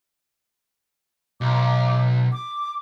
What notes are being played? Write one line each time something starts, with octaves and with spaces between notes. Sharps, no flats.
B1 D6
D6